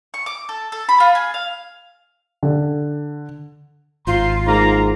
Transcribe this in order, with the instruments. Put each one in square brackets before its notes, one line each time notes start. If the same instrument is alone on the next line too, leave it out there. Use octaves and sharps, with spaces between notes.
[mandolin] C#6
D6
A4
A4
B5
F4
G#4
F5
[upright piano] D3
[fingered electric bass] G#1 [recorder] F4 [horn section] C5 A#5 C6
[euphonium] G#2 [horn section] A#3 A#5